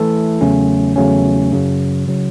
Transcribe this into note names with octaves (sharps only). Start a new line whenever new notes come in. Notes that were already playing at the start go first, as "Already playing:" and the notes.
Already playing: E3 A3 E4 A4
E2 C#3 F#3 A3 C#4
E2 C#3 F#3 A3 C#4
F#2 C#3 F#3
C#3 F#3